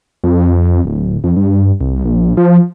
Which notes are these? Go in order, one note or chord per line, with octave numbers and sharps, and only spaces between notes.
F2
D1
F2
G2
C2
A#1
F3